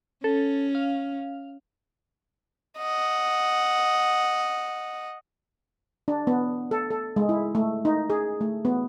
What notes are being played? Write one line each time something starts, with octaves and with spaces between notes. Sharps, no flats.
C#4 A4
F5
D#5 F#5
D4
B3
A4
A4
G#3
E4
A3
D#4
G#4
A3
B3